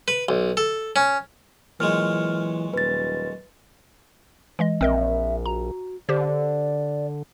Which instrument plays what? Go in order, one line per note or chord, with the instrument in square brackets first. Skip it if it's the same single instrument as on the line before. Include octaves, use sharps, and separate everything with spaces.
[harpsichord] B4
B1
A4
C#4
[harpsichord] A#2 F#3 G#3 [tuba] E3 [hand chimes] F6
[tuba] D#1 [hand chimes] B4 A6
[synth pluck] E3 G#3 D#5
[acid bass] A#1 [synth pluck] C4 A#4 D#5 [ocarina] E5
[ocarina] F#4 [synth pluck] A#5
[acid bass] D3 [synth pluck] G4 C5 [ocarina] D5